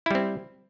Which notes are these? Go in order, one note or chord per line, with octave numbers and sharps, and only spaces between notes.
G3 C4 E4